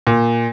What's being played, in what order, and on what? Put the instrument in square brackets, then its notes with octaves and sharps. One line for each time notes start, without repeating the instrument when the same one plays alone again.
[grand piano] A#2